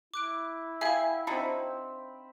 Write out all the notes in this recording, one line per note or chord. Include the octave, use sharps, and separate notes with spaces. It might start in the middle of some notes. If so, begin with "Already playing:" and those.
E4 D6 F#6 D7
G#4 E5 F5 G5 G#5
C4 D4 D#4 F#4 B5